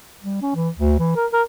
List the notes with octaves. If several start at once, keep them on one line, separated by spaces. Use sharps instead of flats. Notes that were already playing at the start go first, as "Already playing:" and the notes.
G3
C#4
E3
D2
E3
A#4
A#4